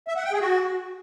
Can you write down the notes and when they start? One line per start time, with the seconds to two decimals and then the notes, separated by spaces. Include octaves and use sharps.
0.08 E5
0.16 F#5
0.24 G5
0.33 G#4
0.41 F#4